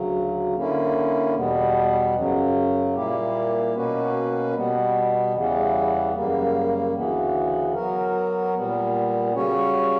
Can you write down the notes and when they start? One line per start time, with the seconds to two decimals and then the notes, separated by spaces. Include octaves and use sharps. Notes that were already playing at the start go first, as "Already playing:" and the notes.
Already playing: D2 C#3 F#3
0.54 D3 A#3 C#4 E4
1.35 E2 B2 G3 B3
2.15 F#2 C#3 F#3
2.95 A#2 G3 A#3 E4 G4
3.74 B2 A#3 C#4 F#4 B4
4.55 B2 G3 B3
5.34 E2 C#3 E3 G3 B3
6.14 F#2 C#3 G3 A#3
6.94 D2 C#3 E3 B3
7.74 F#3 B3 F#4 A#4
8.54 A#2 G3 B3
9.34 C#3 G3 C#4 F#4 C#5